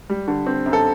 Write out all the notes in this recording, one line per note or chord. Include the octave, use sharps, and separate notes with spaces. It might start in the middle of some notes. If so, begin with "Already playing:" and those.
G3
D3
C4
F#2
A4